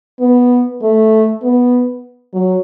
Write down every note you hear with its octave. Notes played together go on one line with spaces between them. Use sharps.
B3
A3
B3
F#3